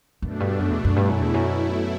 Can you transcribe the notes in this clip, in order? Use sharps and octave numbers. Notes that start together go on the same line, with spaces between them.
F#2 B2 A3 D4
G2
F#2
E2
F#2
G2 B2 A3 E4
F#2
E2
F#2